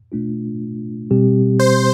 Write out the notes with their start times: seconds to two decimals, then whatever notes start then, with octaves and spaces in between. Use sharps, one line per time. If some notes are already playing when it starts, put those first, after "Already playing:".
0.12 B2 A3 D4 F4
1.11 B2 G3 C4 G4
1.59 C5